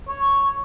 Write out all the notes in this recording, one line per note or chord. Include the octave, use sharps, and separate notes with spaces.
C#5